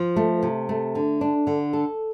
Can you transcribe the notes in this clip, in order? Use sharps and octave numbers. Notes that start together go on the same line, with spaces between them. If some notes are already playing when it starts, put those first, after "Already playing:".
Already playing: F3
A3
C3
A3
D3
D4
D3
A4